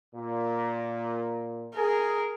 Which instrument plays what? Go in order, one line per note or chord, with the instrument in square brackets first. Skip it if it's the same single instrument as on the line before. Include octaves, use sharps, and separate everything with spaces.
[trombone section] A#2
[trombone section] G#4 [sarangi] A#4